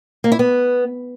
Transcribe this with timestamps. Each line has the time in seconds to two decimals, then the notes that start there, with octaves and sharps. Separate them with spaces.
0.24 A#3
0.32 E4
0.39 B3